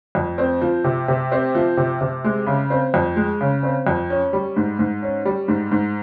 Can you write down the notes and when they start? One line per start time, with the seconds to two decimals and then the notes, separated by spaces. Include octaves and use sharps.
0.15 F2
0.38 C4
0.62 F3
0.84 C3
1.08 C3
1.32 C4
1.55 F3
1.77 C3
2.01 C3
2.24 G#3
2.47 C#3
2.70 C4
2.94 F2
3.16 G#3
3.41 C#3
3.63 C4
3.87 F2
4.10 C#4
4.33 G3
4.56 G#2
4.79 G#2
5.03 C#4
5.25 G3
5.48 G#2
5.71 G#2